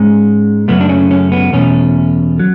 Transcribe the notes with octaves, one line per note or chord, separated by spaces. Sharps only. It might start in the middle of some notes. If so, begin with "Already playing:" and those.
Already playing: G#2 G#3 C#4
F#2 C#3 F#3 A3 B3
D4
C#4
C#4
B3
E2 B2 A3 C#4
F#3